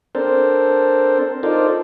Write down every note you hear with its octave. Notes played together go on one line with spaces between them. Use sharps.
C4 D4 A4 A#4 C5
D#4 F4 A4 A#4 C5 D5